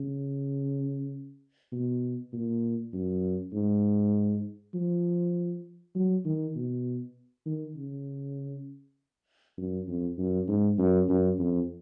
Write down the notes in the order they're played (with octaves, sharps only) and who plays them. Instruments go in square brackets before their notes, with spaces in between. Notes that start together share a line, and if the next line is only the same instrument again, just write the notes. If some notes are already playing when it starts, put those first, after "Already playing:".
Already playing: [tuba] C#3
B2
A#2
F#2
G#2
F3
F#3
D#3
B2
D#3
C#3
F#2
F2
F#2
G#2
F#2
F#2
F2